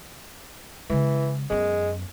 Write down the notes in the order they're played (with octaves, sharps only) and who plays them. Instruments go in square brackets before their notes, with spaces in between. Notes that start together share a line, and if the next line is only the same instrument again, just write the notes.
[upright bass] C#3 G#3 [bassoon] E3
[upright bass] F#2 B3 [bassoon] G#3